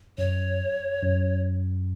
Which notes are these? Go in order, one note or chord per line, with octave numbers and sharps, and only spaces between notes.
F#2 C#5
F#2